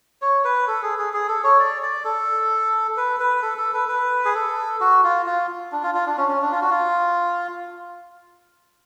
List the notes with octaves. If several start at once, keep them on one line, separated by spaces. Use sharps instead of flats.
C#5
B4
A4
G#4
G#4
G#4
A4
C#5
D5
D5
A4
B4
B4
A4
A4
B4
B4
G#4
A4
F#4
F4
F4
D4
F4
F4
D4
C#4
C#4
D4
F4
F#4
F4